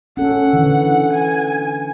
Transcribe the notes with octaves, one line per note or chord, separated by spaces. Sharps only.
C#4 A4 F#5
D3 E3
G#5